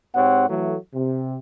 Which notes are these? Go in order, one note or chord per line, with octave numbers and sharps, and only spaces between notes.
G#2 C4 G4 C#5 F#5
E3 F#3 A3
C3